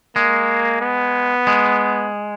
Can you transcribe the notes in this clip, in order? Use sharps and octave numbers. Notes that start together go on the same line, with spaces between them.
G#3 A#3
B3
G#3